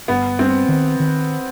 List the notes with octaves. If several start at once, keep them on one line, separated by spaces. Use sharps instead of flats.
G1 B3
G2 C4
D#3
D#3